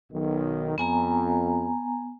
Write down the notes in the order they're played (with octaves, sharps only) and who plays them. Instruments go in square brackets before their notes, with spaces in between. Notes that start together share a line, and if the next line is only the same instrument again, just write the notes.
[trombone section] B1 D#3
[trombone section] F2 [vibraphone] B3 G#5 A#5